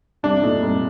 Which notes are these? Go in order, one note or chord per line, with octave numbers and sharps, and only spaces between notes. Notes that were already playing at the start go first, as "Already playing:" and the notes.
C2 D4
A#2 A3 D#4
C2